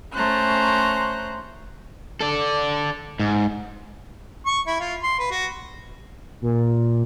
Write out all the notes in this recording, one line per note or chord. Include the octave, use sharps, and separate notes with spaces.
A3 C#4 C5 A#5 F#6
A4 D5
G#2
C#6
E4
F4
C6
B4
F#4
A#2